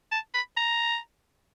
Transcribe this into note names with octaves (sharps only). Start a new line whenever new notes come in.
A5
B5
A#5